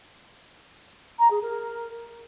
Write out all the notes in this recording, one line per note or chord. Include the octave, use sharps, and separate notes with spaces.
A#5
G#4
A#4